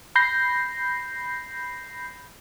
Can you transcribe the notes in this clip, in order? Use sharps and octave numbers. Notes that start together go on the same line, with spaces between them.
B5 G6 A#6 C7